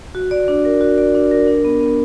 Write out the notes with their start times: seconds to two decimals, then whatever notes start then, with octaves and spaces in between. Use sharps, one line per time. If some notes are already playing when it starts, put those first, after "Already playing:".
0.15 F#4
0.31 D5
0.48 D4
0.65 A#4
0.81 F#4
0.98 D5
1.15 D4
1.31 A#4
1.47 D4
1.65 B3
1.81 B3